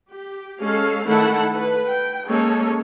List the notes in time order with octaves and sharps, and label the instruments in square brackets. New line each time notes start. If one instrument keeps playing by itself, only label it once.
[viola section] G4
G#3 C#4 A4 F5
D#3 A3 E4 A4 F#5 A5
B4
G5
G#3 A#3 C#4 G#4 A4 C#5